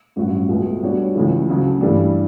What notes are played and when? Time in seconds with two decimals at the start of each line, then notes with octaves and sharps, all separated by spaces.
0.16 A1 G2 F#3 C#4 F#4
0.49 C#2 B2 A3
0.82 B2 G3 D4 F#4 C#5
1.15 C#2 C#3 E3
1.48 D2 C#3 F#3
1.81 G2 E3 G3 D4